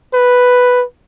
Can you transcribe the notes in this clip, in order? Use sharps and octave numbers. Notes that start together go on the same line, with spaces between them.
B4